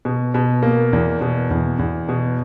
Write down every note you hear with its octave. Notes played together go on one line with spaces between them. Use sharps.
B2
B2
A#3
E2
B2
E2
E2
B2